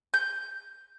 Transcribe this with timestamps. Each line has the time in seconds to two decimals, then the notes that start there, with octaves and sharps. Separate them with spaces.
0.14 G6